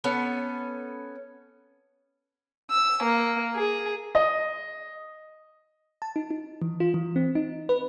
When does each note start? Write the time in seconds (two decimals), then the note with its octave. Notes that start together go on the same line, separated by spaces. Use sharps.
0.04 B3 C#4 A4
2.70 E6
3.02 A#3
3.55 G#4
4.15 D#5
6.02 A5
6.16 D#4
6.31 D#4
6.62 E3
6.80 F4
6.94 E3
7.16 C4
7.35 D#4
7.69 B4